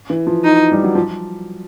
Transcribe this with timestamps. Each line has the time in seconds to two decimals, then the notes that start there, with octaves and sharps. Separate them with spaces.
0.10 E3
0.27 F3
0.44 D#4
0.72 G3
0.84 F#3
0.95 F3